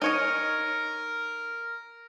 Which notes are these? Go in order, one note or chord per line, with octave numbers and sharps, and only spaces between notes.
D#4 A#4 C#5 D#5